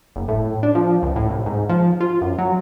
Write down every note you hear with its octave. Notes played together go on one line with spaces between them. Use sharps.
F#1
A2
D4
F3
C#2
A2
C2
G#2
F3
F4
F#2
F#3